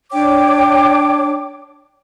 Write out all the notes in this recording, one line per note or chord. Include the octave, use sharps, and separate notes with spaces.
D4 C#5 G5 D6